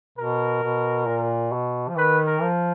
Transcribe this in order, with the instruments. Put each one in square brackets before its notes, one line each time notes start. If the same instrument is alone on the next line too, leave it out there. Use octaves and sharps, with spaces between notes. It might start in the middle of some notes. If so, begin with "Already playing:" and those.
[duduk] B2 [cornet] A#4
[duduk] B2
A#2
B2
F3
[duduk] D#3 [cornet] B4
[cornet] A#4
[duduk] F3